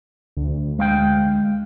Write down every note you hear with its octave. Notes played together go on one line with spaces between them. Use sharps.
D2
G#3 F5 G5